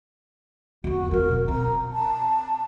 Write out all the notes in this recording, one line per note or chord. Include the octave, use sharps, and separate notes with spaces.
E2 A#3 F#4
G3 C4 A#4
B2
C4 A#5
A5